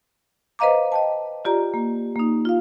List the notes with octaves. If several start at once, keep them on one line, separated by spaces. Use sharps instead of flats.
B4 C5 D#5 F5 A#5 D6
D#5 G5 A5
F4 G4 D5 A#5
A#3
A#3 D#4
F4 F5